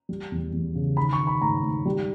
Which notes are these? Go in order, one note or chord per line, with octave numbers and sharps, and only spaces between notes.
G3
E2
E2
C#3
D#3 B5
C#6
D#3
B5
G#2 A#5
G#2
G3